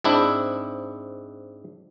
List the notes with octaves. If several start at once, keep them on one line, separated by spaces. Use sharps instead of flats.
G#2 C4 D4 E4